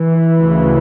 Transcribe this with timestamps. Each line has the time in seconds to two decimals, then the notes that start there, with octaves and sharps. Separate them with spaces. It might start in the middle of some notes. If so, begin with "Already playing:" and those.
Already playing: E3
0.40 D2 C#3